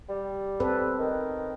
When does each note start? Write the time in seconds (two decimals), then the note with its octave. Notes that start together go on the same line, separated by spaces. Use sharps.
0.09 G3
0.60 C4 A4 B4
0.99 D#3